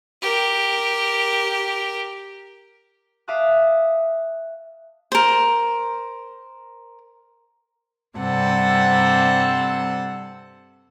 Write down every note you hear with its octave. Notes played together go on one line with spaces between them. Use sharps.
G4 A#4
E5 F5 A5 D6 D#6 F#6
A#4 C5
G2 C3 G3 C4 A4 F#5